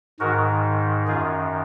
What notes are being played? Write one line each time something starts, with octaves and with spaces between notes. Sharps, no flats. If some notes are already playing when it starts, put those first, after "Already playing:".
G#2 D#3 F#4 A#4
F#2 D#3 F4 G#4